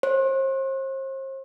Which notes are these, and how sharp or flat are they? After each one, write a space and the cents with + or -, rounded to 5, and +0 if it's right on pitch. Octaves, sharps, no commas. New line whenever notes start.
C5 +40